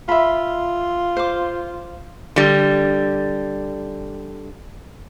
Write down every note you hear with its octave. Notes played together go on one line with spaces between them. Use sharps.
F4 E5 B5
C5 D6
D3 G3